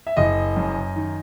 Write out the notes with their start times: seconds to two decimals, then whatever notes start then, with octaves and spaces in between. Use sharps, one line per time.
0.07 E5
0.17 F#1 D#5
0.56 F#2
0.96 D#3